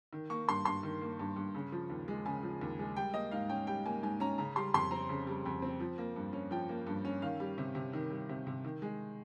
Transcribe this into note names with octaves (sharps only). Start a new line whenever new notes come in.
D#3
A#3 C#6
G2 C6
G2 C6
D#3
A#3
G2
G2
C#3
F3
D#2
G#3
C#3 G#5
F3
D#2
G#3
G3 G5
A#3 D#5
G#2 F5
C#4 G5
G3 G5
A#3 G#5
G#2 G#5
C#4 A#5
C#3 A#5
G3 C6
F2 C6
C4 A#5
C#3
G3
F2
C4
F3
A#3
G2
C#4
F3 G5
A#3
G2
C#4
D#3 F5
G3
C3
C3
D#3
G3
C3
C3
D#3
G#3